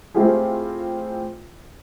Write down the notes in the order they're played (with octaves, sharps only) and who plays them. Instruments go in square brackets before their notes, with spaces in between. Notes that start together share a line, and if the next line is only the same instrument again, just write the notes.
[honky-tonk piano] A3 C4 E4 F4 G4 G#4